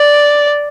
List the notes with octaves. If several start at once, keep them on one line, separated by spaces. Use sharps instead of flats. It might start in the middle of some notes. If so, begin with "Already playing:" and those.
Already playing: D5